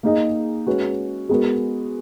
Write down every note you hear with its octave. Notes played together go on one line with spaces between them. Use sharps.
A#3 D#4 G#4 D#5
G#3 C#4 F#4 B4
G#3 B3 F#4 A#4